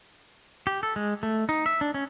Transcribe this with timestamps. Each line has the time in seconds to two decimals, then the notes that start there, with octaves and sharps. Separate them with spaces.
0.67 G4
0.83 A4
0.96 G#3
1.23 A3
1.49 D#4
1.66 E5
1.81 D4
1.94 C#4